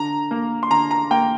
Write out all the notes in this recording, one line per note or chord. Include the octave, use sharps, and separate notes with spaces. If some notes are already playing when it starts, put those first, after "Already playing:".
Already playing: D3 A#5
A#3
C6
D3 A#5
A#5
A#3 G5